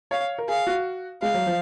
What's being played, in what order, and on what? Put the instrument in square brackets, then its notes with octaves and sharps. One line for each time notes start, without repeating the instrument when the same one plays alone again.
[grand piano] C#5 [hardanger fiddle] F5
[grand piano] A#4
[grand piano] G#4 [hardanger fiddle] F5
[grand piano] F#4
[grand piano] G#3 [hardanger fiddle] F5
[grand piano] F#3
F3